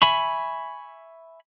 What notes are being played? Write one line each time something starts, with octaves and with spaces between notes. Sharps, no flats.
E5 G#5 B5 C#6